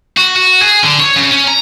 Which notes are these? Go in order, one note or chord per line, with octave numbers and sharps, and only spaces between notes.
F#4
F#4
G#4
D3
C#5
C#3
C#4
A#5